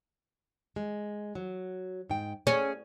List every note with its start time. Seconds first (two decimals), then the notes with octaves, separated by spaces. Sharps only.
0.76 G#3
1.35 F#3
2.09 G#2 G5
2.47 A3 C#4 G#4